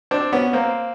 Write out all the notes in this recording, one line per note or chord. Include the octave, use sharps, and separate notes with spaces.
C4 D4
B3 C#4
A#3 C4